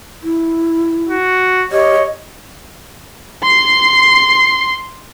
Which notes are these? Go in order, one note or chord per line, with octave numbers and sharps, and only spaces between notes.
E4
F#4
G4 C#5 D#5
C6 C7